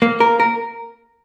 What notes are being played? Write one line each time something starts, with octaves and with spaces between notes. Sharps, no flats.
A#3
A#4
A#4